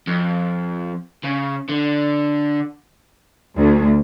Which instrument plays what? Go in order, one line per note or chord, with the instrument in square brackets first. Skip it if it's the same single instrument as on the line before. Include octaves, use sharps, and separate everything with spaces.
[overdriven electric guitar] F2
C#3
D3
[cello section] D2